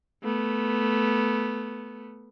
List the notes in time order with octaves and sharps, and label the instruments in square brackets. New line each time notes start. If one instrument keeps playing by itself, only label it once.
[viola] A3 B3